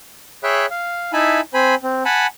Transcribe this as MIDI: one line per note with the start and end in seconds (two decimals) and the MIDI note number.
0.43 0.66 68
0.43 0.66 73
0.43 0.66 76
0.43 0.66 79
0.43 0.66 83
0.43 0.66 90
0.70 1.12 77
1.13 1.41 63
1.13 1.41 64
1.13 1.41 76
1.13 1.41 80
1.13 1.41 81
1.13 1.41 83
1.54 1.75 60
1.54 1.75 72
1.54 1.75 80
1.54 1.75 83
1.83 2.03 60
2.05 2.27 78
2.05 2.27 80
2.05 2.27 81
2.05 2.27 83